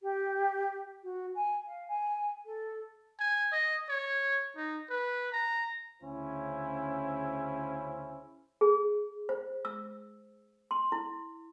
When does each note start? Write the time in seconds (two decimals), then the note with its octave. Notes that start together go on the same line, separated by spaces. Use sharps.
0.01 G4
1.03 F#4
1.35 G#5
1.66 F5
1.88 G#5
2.45 A4
3.19 G#5
3.52 D#5
3.89 C#5
4.56 D#4
4.89 B4
5.33 A#5
6.02 D2 C#3 C#4 E4 C5
8.61 G#4
9.29 C5
9.65 E6
10.71 C6
10.92 E4